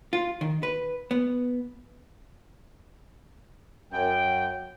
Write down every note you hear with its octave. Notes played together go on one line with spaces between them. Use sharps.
F4
D#3
B4
B3
F#2 G5